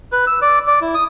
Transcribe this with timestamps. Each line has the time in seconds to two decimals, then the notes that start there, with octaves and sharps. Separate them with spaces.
0.12 B4
0.27 E6
0.42 D5
0.67 D5
0.81 E4
0.95 D#6